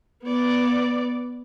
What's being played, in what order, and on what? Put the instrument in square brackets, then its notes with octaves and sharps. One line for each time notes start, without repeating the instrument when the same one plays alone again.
[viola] B3 D5